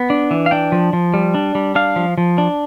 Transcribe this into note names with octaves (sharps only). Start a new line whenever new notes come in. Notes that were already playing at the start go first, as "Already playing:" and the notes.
Already playing: B3
D4
E3
F5
D4 G5
F3
F3
G3
D4
G3
D4 F5
F3
F3
D4